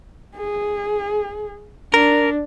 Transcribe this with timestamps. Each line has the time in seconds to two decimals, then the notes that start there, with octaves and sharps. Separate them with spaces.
0.37 G#4
1.94 D4 A#4